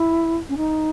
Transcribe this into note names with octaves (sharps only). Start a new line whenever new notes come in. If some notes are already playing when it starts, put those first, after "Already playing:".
Already playing: E4
C#4
D#4